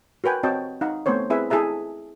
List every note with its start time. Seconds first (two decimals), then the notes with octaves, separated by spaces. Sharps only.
0.24 F#4 A#4 B4 G5 G#5
0.43 C4 F#4 C#5 D#5 G5 A5
0.81 D#4 F5 F#5
1.06 A3 B3 C4 C5 C#5
1.30 C4 E4 G#4 B4 E5 G#5
1.50 E4 G#4 A4 E5 A#5